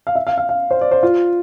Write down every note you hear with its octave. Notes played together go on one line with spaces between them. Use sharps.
F5
E5
F5
F5
F5
C5
D5
C5
F4